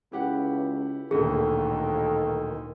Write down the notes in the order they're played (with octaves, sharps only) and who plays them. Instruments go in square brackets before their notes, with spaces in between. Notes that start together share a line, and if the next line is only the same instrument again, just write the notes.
[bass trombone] C#2 [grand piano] E4 G4 F#5
[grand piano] D1 D2 A#2 [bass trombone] D#3 [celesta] G#4 [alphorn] A4